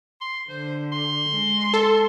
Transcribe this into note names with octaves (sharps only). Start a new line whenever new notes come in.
C6
D3 C5
C6
G#3
A4